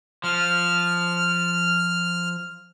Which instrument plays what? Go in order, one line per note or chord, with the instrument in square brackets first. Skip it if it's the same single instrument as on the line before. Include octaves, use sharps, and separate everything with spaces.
[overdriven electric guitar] F3 [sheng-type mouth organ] F6